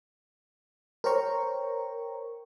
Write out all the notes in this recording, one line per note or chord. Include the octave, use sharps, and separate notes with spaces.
A#4 C5 C#5 G5 A#5 C#6